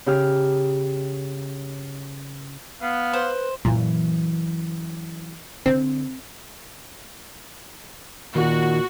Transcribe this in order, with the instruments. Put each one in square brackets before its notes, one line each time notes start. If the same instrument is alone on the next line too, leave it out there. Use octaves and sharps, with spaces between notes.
[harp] C#3 G4 F6
[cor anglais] B3 [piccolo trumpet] F5
[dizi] B4 [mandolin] C5
[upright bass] F#2 E3 [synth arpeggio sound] A#2
[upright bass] D3 [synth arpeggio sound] C4
[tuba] A#2 [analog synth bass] D#3 [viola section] F#4